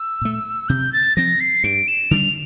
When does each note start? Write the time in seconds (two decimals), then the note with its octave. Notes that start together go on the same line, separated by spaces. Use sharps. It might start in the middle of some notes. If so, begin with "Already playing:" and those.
Already playing: E6
0.21 A#2 A3
0.69 C3 G6
0.93 A6
1.16 F3 C4 A#6
1.40 C7
1.64 G2 D7
1.88 E7
2.11 D3 G3 D4 F7